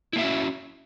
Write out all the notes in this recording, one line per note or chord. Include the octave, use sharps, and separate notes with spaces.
A#3 C#4 E4 F#4 E5